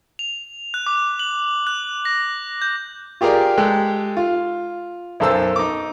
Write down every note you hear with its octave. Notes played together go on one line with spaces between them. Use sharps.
F7
F#6
D6
F#7
F#6
A#6
G6
F4 G4 G#4 A#4 D5 G5
G#3 G4 A4 G5 F#6
F4
B1 F#2 A4 C5 E6
D#4 D6